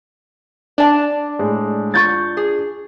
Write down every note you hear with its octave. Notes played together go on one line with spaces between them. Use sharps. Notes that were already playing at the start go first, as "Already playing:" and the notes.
D4 D5 A5
A2 G#3
F4 C#6 G6 A6
G#4